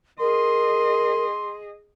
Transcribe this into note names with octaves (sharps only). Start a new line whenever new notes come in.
G#4 A#4 D#5 C6